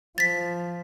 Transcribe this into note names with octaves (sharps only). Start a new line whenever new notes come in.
F3 A6 B6